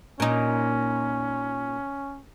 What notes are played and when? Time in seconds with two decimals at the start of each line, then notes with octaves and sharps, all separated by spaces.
0.20 A#2 C#4 D#4